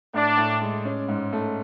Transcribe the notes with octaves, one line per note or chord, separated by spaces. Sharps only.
A2 D4
A2
G#3
C#4
G#2
A3